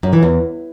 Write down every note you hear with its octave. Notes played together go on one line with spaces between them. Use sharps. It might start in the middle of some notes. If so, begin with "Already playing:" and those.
F#2
E3
E2